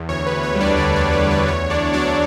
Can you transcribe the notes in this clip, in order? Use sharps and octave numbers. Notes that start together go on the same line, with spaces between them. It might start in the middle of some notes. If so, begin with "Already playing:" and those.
Already playing: E2
D2 C#5
B4
D2
C#5
G3
D4 D5
D3 D4 D5
D4 D5
D2
B4
D2
B4
E2 C#5
E2 D4 D5
F#3 D4 D5